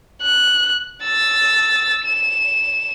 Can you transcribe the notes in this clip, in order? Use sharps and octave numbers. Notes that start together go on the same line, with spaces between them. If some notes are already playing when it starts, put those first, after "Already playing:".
F#6
E6 A6
E7